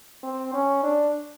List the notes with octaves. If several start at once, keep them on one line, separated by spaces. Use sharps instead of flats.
C4
C#4
D4